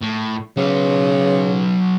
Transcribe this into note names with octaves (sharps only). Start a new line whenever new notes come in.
A2
C#3 F#3 B4